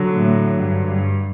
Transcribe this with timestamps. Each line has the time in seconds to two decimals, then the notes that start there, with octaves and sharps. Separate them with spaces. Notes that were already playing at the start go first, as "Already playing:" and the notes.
Already playing: D3 F#3
0.14 A2
0.58 G2
0.86 G2